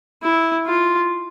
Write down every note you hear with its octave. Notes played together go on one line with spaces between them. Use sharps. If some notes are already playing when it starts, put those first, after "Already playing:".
E4
F4